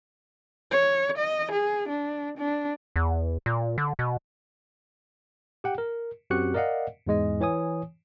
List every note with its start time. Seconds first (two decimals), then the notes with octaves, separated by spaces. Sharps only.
0.71 C#5
1.18 D#5
1.52 G#4
1.89 D4
2.38 D4
2.96 E2
3.46 A#2
3.78 D3
3.99 B2
5.64 G4 F#5 G5
5.78 A#4
6.30 F#2 C4 F#4 G4 F#6 C#7
6.54 A#4 D5 D#5 F5 F#5
7.07 E2 G#2 G#3 D#5
7.41 E3 C#5 G#5 D#6